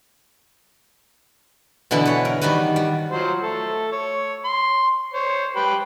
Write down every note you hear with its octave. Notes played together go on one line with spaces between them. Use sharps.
B2 D3 E3 B3 E4
B4 C#5
A#4
D#3 G3 B3 F#4 B4
G3
F3 F#3 C5
A3 A4
C#5
C6
C5 C#5
G4 B4 B5